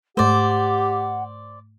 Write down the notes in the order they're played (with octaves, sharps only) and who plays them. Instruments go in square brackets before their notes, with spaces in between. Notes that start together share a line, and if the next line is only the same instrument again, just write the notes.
[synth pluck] G#2 A3 [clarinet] G4 [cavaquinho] C5 D5 [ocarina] F#5